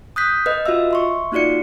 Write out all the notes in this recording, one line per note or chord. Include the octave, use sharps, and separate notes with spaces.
D#6 F#6 G6 B6
B4 D#5
F4 F#4 D#5 E5 E6
E5 C6 C#6
A#3 D#4 F4 F#4 D5 C#7